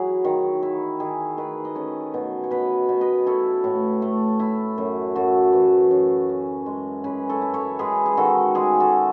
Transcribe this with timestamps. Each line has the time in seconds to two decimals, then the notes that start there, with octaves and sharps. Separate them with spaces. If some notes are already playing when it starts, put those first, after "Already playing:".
Already playing: F#3 E4 F#4 G#4
0.25 D#3
0.63 E4
1.00 D#3 G#4
1.37 D#3 G#4 B4
1.65 D#5
1.75 C#4 A4 C#5
2.14 B2
2.44 C#5
2.51 B2 B4 D#5
2.89 B2
3.01 B4 D#5
3.26 E4 A4 C#5
3.64 A2
4.02 A3
4.39 E4
4.78 F#2
5.15 F#2 F#4 A4
5.53 E3
5.91 F#2
6.29 C#4
6.66 G#3
7.04 C#4 G#4 B4
7.29 A4 C#5
7.42 E4
7.54 A4 C#5
7.79 G#3 G#4 B4
8.06 G#4
8.17 D#3 F#4 A4
8.55 G#3 G#4
8.80 F#4 A4